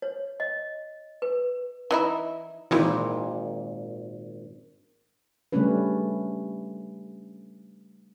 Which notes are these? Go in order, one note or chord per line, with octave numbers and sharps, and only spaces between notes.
C#5
D#5
B4
E3 D#4 E4
G#1 A#2 E3 D#4 E4
C#3 G3 A3 C#4 D4 B4